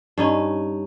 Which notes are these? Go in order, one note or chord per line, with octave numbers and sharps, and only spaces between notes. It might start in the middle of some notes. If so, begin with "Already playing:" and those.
G2 C#4 D#4